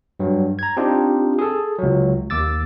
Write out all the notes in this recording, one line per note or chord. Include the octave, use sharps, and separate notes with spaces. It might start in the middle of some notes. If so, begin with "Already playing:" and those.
G2 F#3
A#5 G#6
C4 D4 D#4 F4 G4
G#4 A4
C#2 F#3
D#2 D6 E6 A6